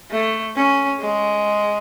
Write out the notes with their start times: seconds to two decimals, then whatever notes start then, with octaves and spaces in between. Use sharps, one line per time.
0.10 A3
0.55 C#4
1.00 G#3